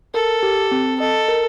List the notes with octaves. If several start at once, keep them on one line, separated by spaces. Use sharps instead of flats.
A4 A#4
G4
C4
A4 D#5
A#4